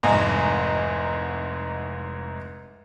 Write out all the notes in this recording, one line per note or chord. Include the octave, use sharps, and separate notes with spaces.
F1 C2 G#2 D#5 G#5